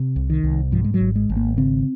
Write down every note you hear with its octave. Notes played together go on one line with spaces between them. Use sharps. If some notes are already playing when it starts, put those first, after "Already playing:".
Already playing: C3
C2
D#3
C2
G#2 F3
G#3
F#3
G#1
G#3
G#1
A#3
C#3 C4